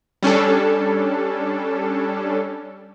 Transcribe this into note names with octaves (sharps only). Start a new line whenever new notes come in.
G3 C#4 D4 A4